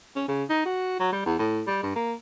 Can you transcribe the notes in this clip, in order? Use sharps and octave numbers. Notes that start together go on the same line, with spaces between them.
C#4
C#3
D#4
F#4
F#3
G3
E2
A2
G3
G2
A#3